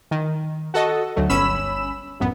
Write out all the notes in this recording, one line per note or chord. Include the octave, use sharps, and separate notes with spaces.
D#3
F#4 A4 D#5
D2 F#3 A3
G1 C#4 B5 E6 E7
A1 F#2 B3